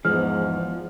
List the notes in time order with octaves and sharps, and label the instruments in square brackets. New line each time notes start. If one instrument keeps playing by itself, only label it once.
[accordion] E2 G#2 [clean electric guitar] E3 [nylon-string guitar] F3 G#3 [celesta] F6